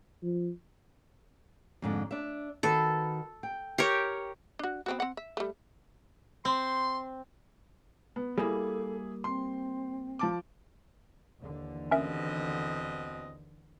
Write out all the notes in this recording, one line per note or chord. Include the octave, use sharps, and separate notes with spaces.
F3
F2 G#2 D3
D4 E5
D#3 F#4 A4 B4
G5
G4 A#4 C#5
D4 F#4
B3 C4 F#4
C4 F#5
E5
G3 A3
C4 C6
B3
G3 A#3 E4 G#4 A4
C4 C6
F3 A5 D6
D#2 D3 E3
B2 C4 C#4 A#4 D#5 E5